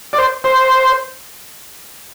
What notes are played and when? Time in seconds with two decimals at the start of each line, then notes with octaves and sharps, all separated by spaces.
0.13 D5
0.18 C5
0.44 C5